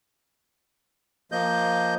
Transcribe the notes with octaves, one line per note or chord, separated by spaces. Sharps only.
F3 A#3 D#5 G6